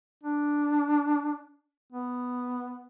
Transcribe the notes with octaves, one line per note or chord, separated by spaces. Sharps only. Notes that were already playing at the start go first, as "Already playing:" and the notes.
D4
B3